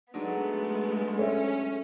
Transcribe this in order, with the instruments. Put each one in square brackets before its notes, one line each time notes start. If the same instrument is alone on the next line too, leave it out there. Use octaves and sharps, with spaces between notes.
[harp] F#3 D4 D#4 [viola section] G#3 A3 [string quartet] B3
[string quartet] C#4 [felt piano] A4 C#5 E5